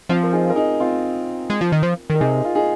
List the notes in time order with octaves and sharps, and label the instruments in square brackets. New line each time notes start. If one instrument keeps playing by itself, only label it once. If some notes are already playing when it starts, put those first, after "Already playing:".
[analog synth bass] F3 [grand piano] C4 F4
[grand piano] A#4
D#4 G#4
A#4
D#4 G#4
C4 F4
[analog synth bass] G#3
F3
D#3
F3
[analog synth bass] D#3 [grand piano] A#4
[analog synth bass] C3 [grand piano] D#4 G#4
[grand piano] F4
D#4 G#4